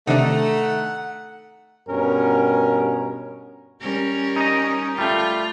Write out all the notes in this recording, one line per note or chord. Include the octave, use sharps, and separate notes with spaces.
C3 D#3 A3 D4 D#4 F#5
G2 B2 C#4 A#4
G3 C#4 A#4
D#4 D#5
G3 A3 F4